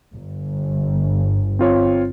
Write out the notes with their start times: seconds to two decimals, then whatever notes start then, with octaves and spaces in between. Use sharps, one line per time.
0.15 G1
1.59 C4 F4 C#5